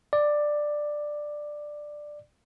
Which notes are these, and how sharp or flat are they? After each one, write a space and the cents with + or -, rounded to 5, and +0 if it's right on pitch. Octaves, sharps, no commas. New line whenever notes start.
D5 +10